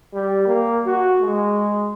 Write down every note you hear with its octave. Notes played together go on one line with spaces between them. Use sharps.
G3
A#3
F#4
G#3